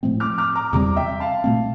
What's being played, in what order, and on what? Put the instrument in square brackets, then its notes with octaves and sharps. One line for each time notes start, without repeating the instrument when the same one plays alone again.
[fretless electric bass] A2 F3 A3 C4
[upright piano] D6 F6
D6 F6
A#5 D6
[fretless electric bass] E2 C3 G3 C4 [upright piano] A#5 D6
[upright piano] E5 G5
F5 A5
[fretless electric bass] A#2 A3 C4